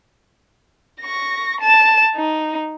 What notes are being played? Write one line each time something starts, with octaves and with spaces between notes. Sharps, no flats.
C#6 A#6
A5 E7
D#4